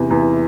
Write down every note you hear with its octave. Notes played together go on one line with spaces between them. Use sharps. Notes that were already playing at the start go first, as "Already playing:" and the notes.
Already playing: E2 C3
E2